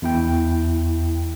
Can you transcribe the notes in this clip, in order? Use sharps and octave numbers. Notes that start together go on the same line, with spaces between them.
E2 E4 G5